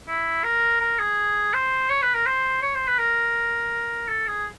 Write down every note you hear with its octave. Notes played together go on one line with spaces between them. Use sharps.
E4
A#4
A#4
G#4
C5
C#5
B4
A#4
C5
C#5
C5
B4
A#4
A4
G#4